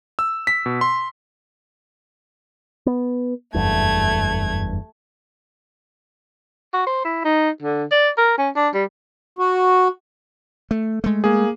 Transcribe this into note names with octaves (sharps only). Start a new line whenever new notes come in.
E6
B6
B2
C6
B3
F#1 E2 G2 A3 G#6
F#4
C5
E4
D#4
D3
D5
A#4
C#4
D4
G3
F#4
A3
G#3 A3
A#3 G#4